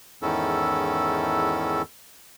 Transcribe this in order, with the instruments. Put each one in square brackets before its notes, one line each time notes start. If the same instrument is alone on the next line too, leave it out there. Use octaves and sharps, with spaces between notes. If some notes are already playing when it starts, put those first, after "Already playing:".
[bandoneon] E2 G#2 D#3 C#4 E4 A4